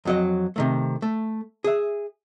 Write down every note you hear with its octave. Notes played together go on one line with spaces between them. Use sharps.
F2 F#3 D#5
C3 D#3 A3
A3
G#4 E5